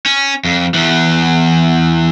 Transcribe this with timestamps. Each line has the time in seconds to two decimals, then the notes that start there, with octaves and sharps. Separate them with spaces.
0.06 C#4
0.45 F2
0.75 E2 E3